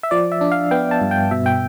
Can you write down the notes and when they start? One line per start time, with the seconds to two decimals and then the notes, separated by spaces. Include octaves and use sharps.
0.03 E5
0.11 F3 D5
0.32 E5
0.41 D4
0.52 F5
0.71 B3 G5
0.91 A5
1.01 G2
1.11 G5
1.31 B2 E5
1.46 G5